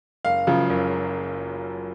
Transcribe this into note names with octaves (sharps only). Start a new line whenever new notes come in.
F#1 F5
F#2 C#3 F3
F#1